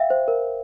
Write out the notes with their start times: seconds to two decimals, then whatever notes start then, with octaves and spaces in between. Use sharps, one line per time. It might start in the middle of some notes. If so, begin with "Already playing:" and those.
Already playing: E5 F5 G5
0.10 C5
0.28 A#4